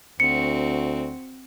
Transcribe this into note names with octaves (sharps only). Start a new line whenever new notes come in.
D2 C4 F#4 C#7